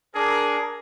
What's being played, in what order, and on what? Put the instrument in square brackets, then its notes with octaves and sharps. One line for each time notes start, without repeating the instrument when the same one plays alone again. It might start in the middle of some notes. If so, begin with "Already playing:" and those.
[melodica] D4 [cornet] G#4 [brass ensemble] A#4